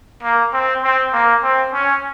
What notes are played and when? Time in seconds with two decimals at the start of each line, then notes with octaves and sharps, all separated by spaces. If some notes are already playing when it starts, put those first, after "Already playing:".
0.23 A#3
0.53 C4
0.84 C4
1.13 A#3
1.43 C4
1.73 C#4